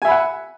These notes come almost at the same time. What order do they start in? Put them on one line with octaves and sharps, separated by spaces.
G#5 E5 B5 F#5